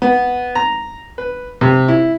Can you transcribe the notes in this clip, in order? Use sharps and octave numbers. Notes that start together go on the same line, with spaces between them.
B3
A#5
B4
C3
E4